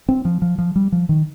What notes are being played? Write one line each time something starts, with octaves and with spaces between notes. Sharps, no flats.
C4
F3
F3
F3
G3
F3
D#3